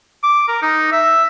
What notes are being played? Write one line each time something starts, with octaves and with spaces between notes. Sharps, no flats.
D6
A#4
D#4
E5